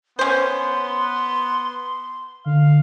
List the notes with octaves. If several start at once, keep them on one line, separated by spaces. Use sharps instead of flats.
B3 C#4 C5 C6
D3 F5